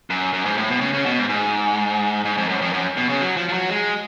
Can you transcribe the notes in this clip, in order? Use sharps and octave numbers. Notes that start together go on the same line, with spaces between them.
F#2
F#2
G#2
A2
B2
C#3
C#3
B2
G#2
G#2
G#2
F2
F#2
F2
F#2
B2
C#3
F#3
F3
F3
F#3
G#3